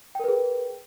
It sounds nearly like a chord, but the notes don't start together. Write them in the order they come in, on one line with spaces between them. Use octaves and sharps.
G5 A#4 B4 G#4